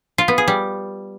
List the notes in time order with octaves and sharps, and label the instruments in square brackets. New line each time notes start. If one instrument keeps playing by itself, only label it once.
[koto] F4
B3
G#4
G3